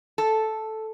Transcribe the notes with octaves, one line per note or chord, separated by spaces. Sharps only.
A4